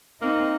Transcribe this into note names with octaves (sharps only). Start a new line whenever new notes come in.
A#3 C4 D#4